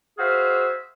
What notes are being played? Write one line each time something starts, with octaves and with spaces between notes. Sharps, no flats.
F#4 G#4 C5 E5 F5